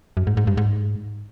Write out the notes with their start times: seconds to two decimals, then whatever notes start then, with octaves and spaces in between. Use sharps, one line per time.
0.17 F#2
0.27 G#2
0.37 G#2
0.47 G2
0.57 G#2